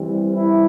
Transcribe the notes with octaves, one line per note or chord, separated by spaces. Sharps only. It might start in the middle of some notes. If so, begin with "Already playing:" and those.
Already playing: E3 G3 C4
E4